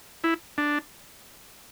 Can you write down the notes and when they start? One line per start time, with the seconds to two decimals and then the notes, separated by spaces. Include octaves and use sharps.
0.24 E4
0.58 D4